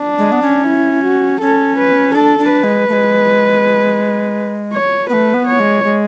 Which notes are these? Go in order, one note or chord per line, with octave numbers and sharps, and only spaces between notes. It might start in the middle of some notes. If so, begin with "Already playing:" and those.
Already playing: D4
G#3
B3
C#4
E4
F#4
C#4 A4
B4
D4 A4
D4
B4
G#3
A3
G#3
C#5
A3 B3 B4
B3
C#5
G#3
G#3